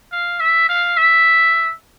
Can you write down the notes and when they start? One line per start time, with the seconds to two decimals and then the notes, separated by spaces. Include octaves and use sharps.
0.12 F5
0.40 E5
0.69 F5
0.97 E5